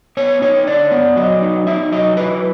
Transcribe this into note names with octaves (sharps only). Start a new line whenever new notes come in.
B3 C#5
D#4 C#5
D3 D5
B3
F#3 D#5
D#4
D#4 E5
F#3 D#5
E4 B4